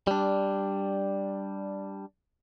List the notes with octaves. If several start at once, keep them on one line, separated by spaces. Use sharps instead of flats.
G3 D4